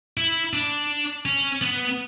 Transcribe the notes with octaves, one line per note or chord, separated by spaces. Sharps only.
E4
D4
C#4
B3